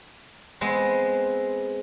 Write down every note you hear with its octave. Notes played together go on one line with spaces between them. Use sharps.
G#3 B3 C4